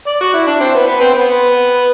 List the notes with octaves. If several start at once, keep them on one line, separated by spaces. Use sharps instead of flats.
D5
F#4
E4
D4
C4
B3
B3
C4
B3